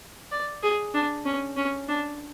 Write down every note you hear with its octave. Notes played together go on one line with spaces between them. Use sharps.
D5
G#4
D4
C#4
C#4
D4